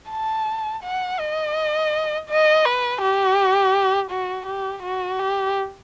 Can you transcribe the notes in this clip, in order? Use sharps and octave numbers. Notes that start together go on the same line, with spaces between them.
A5
F#5
D#5
D#5
B4
G4
F#4
G4
F#4
G4